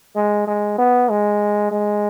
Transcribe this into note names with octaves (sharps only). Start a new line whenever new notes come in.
G#3
G#3
B3
G#3
G#3